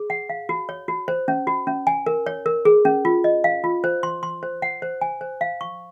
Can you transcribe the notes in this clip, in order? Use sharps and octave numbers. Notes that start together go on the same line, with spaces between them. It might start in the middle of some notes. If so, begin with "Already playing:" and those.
Already playing: G#4
F#5
F5
F#4
C#5
F#4
C5
C#4
F#4
C#4
G#5
A#4
C#5
A#4
G#4
C#4
F4
D#5
F5
F4
C5
C6
C6
C5
F#5
C5
G#5
C5
F5
C#6